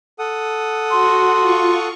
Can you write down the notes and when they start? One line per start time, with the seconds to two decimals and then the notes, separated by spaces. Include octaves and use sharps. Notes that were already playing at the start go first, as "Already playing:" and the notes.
0.19 A4 F#5 D#6
0.91 F#4 C6
1.40 F4 C#6